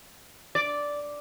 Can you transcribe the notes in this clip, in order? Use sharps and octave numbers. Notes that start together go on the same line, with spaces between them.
D5